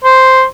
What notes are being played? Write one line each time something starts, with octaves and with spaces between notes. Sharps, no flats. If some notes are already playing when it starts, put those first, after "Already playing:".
C5